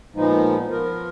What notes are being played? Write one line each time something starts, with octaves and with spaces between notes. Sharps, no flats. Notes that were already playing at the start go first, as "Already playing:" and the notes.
A#2 F3 G#3 B3 D#4
F3 B3 F4 A#4